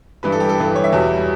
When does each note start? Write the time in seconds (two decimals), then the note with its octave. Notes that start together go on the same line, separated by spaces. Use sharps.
0.23 G2 E3 G3 B4
0.32 A4
0.40 G4
0.49 A4
0.58 G2 E3 G3 B4
0.76 C#5
0.84 E5
0.92 E2 B2 G3